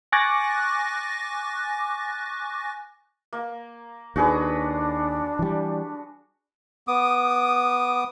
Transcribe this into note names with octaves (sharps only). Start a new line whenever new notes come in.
G#5 C#6 D6 F#6 A6 A#6
A#3
D#2 D4 F#4 G#4 B4
E3 G3
B3 D6 D#6